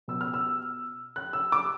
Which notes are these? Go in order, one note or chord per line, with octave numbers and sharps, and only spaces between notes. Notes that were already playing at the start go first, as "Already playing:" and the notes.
B2 E6
F6
E6
F#6
E6
D6